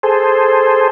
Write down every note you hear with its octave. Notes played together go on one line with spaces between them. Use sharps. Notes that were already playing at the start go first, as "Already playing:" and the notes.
G#4 A4 C5